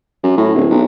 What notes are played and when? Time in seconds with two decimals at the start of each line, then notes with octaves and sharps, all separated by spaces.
0.23 F#2
0.37 A2
0.55 D1
0.70 B1